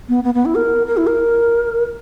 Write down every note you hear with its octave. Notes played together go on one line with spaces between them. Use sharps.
B3
B3
B3
E4
A#4
A#4
E4
A#4